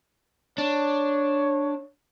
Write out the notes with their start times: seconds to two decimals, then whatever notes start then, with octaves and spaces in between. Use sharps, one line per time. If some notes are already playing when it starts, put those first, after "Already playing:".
0.58 D4 C#5